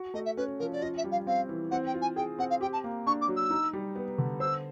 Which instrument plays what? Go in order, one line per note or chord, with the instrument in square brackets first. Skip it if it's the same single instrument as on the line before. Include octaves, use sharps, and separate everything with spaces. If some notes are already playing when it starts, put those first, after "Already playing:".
Already playing: [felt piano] F#4
[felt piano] A3 [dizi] D#5
[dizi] E5
[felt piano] C#4 [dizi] B4
[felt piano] F3 [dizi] A#4
[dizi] D5
[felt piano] F4 [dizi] D#5
[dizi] E5
[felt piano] G3
[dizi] F5
[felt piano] C4 [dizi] F5
[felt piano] E3
[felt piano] C4 [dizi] F#5
[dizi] G5
[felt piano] F4
[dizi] G#5
[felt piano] G#4 [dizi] G5
[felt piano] C4 [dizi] F#5
[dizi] F5
[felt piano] G4 [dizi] G5
[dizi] A5
[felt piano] A#3
[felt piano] D4 [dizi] C#6
[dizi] D6
[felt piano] F#3
[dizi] E6
[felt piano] D#4
G3
B3
D3
[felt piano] C5 [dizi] E6